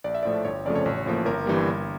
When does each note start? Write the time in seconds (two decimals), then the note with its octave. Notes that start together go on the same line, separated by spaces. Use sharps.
0.04 A#1 D5
0.15 E5
0.23 A2 F3 A3 D5
0.45 G1 C#5
0.65 F2 C#3 F3 A3 D5
0.75 C#5
0.86 A1
1.06 A2 F3 A#3
1.25 G1 A#4
1.46 G2 E3 G3 A#3
1.66 G1